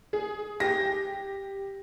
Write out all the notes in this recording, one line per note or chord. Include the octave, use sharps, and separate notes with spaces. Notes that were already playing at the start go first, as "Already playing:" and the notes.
G#4
G4 A#6